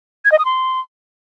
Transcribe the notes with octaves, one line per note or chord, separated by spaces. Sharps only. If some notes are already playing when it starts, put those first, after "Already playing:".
G#6
D#5
D#6
C6